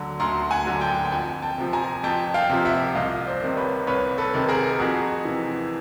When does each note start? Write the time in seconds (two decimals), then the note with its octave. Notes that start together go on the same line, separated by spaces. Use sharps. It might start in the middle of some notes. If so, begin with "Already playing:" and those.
Already playing: D2 D3 F#3
0.20 D2 A#5 C6
0.51 F#5 G#5
0.66 D3 F#3
0.81 G5 A5
1.05 G5
1.12 F2 F#5 G#5
1.42 G5 A5
1.58 C3 F3
1.73 G#5 A#5
2.03 F2 G5 A5
2.34 F5 G5
2.49 C3 F3
2.65 E5 F#5
2.95 C2 D#5 F5
3.26 C5 D5
3.42 C3 D#3
3.56 B4 C#5
3.87 C2 B4 C#5
4.18 A4 B4
4.33 C3 D#3
4.49 G#4 A#4
4.80 F2 F#4 G#4
5.25 C3 E3